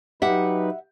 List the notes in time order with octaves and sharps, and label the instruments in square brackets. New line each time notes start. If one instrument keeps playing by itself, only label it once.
[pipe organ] F#3 D#4 B4 [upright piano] G4 [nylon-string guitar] E5 F#5